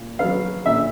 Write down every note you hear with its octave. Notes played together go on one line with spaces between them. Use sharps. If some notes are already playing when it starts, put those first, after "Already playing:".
Already playing: A#2
F#3 B3 F5
A#2 E5